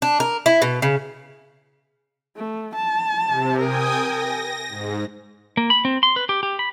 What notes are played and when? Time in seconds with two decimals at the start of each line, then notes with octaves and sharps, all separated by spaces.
0.02 D4
0.20 A#4
0.46 E4
0.62 B2
0.82 C#3
2.36 A3
2.76 A5
3.25 C3
3.59 A#4 G5 G#5 D#6
3.99 A#6
4.69 G#2
5.57 A#3
5.70 B5
5.85 C4
6.03 C6
6.16 B4
6.29 G4
6.43 G4
6.59 B5